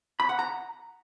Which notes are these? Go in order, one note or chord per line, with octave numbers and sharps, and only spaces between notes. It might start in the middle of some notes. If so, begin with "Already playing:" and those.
B5
F#5
A#5